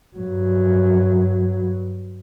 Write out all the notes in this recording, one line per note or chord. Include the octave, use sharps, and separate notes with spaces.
G2 F#3